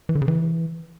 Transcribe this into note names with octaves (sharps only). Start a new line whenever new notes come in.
E3
D3
C#3
E3